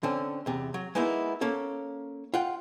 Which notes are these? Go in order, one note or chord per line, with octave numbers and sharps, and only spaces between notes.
D3 C4 C#4 A4
E2 C3
F#3
G#3 A#3 B3 D#4 E4
A#3 C#4 A4
F4 F#5 G5